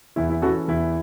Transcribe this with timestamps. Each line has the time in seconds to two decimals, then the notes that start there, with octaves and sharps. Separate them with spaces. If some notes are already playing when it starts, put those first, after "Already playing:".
0.16 E2 E4
0.29 E4
0.42 E3 C#4 F#4 A4
0.68 E2 E4